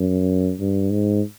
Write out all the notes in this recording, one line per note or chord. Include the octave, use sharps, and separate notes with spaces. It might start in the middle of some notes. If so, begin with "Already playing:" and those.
Already playing: F#2
G2
G#2